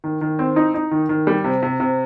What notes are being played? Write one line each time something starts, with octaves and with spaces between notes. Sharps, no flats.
D#3
D#3
C4
D#4
D#4
D#3
D#3
G3
C3
C3
C3